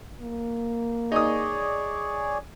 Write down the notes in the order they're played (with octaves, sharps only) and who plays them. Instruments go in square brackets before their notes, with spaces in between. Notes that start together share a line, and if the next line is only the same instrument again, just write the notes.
[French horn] A#3
[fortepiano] D#4 D#6 [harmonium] G#4 C#5 D5